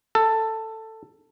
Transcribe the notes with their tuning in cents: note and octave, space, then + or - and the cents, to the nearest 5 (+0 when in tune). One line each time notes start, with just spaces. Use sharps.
A4 +10